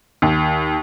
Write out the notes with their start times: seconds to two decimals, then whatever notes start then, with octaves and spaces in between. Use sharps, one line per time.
0.22 D#2